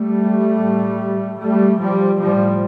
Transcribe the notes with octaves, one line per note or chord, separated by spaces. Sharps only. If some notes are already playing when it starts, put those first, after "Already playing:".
Already playing: G3 A3
A2
G3 A3
F3 G3
A2 F3 G3